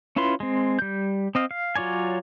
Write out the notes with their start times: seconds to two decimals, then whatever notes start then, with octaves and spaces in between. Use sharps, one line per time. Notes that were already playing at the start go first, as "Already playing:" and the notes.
0.16 C#4 E4 F4 B4 C6
0.40 G#3 C4
0.79 G3 G6
1.35 C4 D#5 F5
1.51 F5
1.76 F#3 F4 C#5 D5 G#5